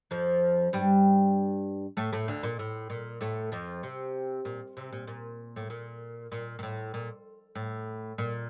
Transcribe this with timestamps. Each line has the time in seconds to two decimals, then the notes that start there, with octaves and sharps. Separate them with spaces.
0.11 F2 F3
0.73 G2 G3
1.97 A2 A3
2.12 A2 A3
2.28 D2 D3
2.43 A#2
2.59 A2
2.90 A#2
3.21 A2 A3
3.52 F2 F3
3.83 C3
4.45 A#2
4.77 C3
4.92 A#2
5.07 A#2
5.56 A2
5.70 A#2
6.32 A#2
6.59 A#2
6.63 A2
6.94 A#2
7.55 A2
8.18 A#2